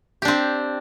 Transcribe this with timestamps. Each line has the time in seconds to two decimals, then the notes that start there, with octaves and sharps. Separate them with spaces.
0.22 G4
0.25 D4
0.28 C4